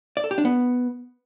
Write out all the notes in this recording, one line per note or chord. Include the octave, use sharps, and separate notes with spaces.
D5
A4
G4
D4
B3